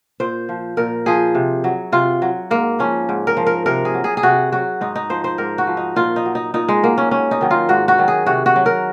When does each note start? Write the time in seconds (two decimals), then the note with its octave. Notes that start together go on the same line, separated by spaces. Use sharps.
0.20 A#2 C5
0.49 F3
0.77 A#2 A#4
1.06 F3 G#4
1.35 C3
1.64 F#3
1.92 C3 F4
2.22 F#3
2.51 G#2 A#3
2.79 F3 C#4
3.09 G#2
3.27 A#4
3.37 F3
3.46 A#4
3.66 C3 A#4
3.85 G#4
3.94 F#3
4.04 G#4
4.17 G#4
4.23 C3 F#4
4.52 F#3 F#4
4.81 G#2 D#4
4.96 D#4
5.10 F3 C5
5.24 C5
5.38 G#2 A#4
5.58 F#4
5.67 F3
5.77 D#4
5.96 A#2 F4
6.16 D#4
6.26 F#3
6.35 D#4
6.54 A#2 D#4
6.68 G#3
6.83 F#3 A#3
6.98 C#4
7.11 G#2 C#4
7.31 D#4
7.41 D#3 F#3
7.51 F4
7.69 G#2 F#4
7.88 F#4
7.98 D#3 F#3
8.08 G#4
8.26 C3 F#4
8.46 F#4
8.56 F#3
8.66 A#4